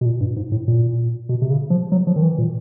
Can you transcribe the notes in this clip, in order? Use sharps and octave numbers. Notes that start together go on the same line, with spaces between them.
B2
A#2
G2
G#2
A2
A#2
B2
C3
C#3
F3
F#3
F3
D#3
E3
A#2